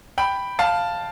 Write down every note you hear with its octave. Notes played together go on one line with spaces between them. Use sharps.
G5 B5
F5 A5